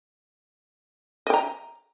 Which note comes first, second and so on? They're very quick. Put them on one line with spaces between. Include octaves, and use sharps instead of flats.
D#5 G5 A#5